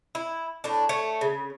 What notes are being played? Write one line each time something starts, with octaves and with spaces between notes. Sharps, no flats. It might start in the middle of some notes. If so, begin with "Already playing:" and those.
E4
A2 D4
A3 C#5
C#3